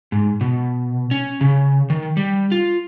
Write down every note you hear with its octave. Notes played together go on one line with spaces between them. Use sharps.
G#2
B2
C#4
C#3
D#3
G3
F4